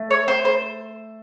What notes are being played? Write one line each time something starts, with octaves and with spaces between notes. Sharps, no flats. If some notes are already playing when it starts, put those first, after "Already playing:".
Already playing: A3
C#5
C5
C5